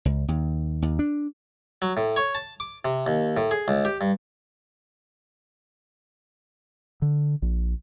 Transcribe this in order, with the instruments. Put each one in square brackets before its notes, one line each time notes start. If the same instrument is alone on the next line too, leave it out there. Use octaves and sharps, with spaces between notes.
[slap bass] C#2
D#2
D#2
D4
[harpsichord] F#3
A2
C#5
A5
D6
C3
D#2
A2
G#4
C#2
G4
G2
[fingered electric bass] D3
A#1